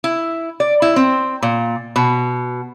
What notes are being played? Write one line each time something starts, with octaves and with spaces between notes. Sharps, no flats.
E4
D5
E4
C4
A#2
B2